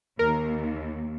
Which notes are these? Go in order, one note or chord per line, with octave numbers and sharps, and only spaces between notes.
D#2 A#4